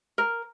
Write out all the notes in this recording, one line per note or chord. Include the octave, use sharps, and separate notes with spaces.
A#4